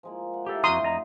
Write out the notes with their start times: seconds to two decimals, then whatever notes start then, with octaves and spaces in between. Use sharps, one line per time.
0.03 F3 G#3 A#3
0.34 F#5
0.46 E4 G4 A4 A#4 D5
0.64 F2 F#3 A3 D4 F#4 A#5 C6 D#6
0.83 F2 D#5 A#5